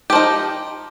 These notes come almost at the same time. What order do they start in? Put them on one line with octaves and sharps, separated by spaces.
G4 F3 D#4